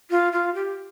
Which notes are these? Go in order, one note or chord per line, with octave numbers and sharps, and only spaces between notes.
F4
F4
G4